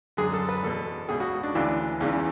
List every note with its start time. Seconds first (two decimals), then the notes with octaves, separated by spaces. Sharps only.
0.17 F#2 D3 G#4
0.33 A4
0.49 B4
0.63 E2 B2 A4
1.09 C#2 B2 G#4
1.20 F#4
1.43 D4
1.55 D2 C#3 E3 D4
2.01 E2 C#3 E3